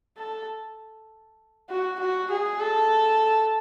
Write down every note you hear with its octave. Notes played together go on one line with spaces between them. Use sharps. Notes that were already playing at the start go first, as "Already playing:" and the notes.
A4
F#4
F#4
G#4
A4